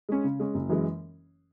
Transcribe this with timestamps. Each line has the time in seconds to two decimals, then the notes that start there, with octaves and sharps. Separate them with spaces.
0.09 G#3 C#4
0.24 C#3
0.40 G#3 C#4
0.54 F#1
0.69 F#2 E3 G#3